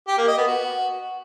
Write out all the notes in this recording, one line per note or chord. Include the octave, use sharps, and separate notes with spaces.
G4
A#3
D#5
B3
F#4